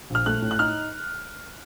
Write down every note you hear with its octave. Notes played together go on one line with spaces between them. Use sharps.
A#1 F6
A3 F#6
A2
F#6
D#4 F6